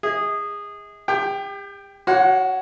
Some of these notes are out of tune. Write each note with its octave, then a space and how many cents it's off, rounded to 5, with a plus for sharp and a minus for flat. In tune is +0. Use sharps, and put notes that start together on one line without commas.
G#4 -20 D#5 +45
G4 +40 G5 +0
F#4 +15 C#5 +0 F#5 -45